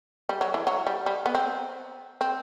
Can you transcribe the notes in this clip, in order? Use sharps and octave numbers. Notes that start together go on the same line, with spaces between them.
G3
F#3
E3
F#3
G3
G3
B3
C4
C4